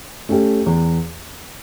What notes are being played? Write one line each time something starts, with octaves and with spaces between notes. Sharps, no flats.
A3 C#4 G4
E2